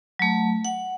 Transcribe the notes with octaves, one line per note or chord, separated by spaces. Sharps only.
F#3 A3
F#5